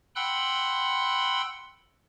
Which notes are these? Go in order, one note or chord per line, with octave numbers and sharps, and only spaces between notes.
F#5 G5 B5 C6 E6 F#6